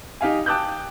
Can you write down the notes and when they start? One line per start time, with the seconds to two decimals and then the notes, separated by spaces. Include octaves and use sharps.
0.21 D#4 G4 F5 G#5
0.46 G5 A5 D6 D#6 F#6 G6